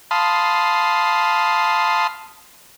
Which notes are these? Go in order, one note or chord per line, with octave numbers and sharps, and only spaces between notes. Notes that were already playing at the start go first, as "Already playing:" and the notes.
F5 A5 B5 C6 D#6